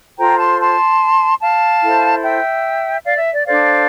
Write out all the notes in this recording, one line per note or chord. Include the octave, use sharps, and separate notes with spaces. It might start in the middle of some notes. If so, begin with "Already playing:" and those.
F4 A4 C5 G5 A#5
A5 C6
A5 C6
F5 A5
E4 A4 C5
E5 G5
D5 F5
E5
D5
D4 A4 C5 D5 F5